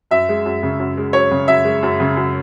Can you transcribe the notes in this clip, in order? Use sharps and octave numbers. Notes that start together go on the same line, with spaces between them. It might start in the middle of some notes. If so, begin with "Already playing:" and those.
F#2 E5
G#3
F#2
C#3
F#2
G#3
F#2 C#5
C#3
F#2 E5
G#3
F#2
C#3
F#2